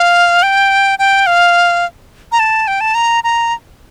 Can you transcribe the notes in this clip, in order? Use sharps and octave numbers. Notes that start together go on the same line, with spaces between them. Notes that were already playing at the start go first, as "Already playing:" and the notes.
Already playing: F5
G5
G5
F5
A#5
A5
G5
A5
A#5
A#5